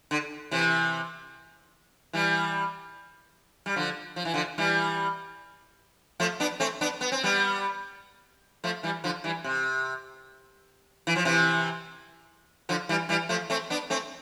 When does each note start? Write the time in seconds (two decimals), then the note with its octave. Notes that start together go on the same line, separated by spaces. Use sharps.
0.11 D3
0.51 C3 E3
2.13 E3 G3
3.66 G3
3.76 D3 F3
4.16 F3
4.25 E3
4.34 D3 F3
4.58 E3 G3
6.20 F3 A3
6.40 B3 D4
6.60 A3 C4
6.81 B3 D4
7.01 B3
7.12 C4
7.24 G3 B3
8.64 F3 A3
8.83 E3 G3
9.04 D3 F3
9.24 E3 G3
9.44 C3
11.07 E3
11.16 F3
11.25 C3 E3
12.69 D3 F3
12.89 E3 G3
13.09 E3 G3
13.29 F3 A3
13.50 A3 C4
13.70 B3 D4
13.90 A3 C4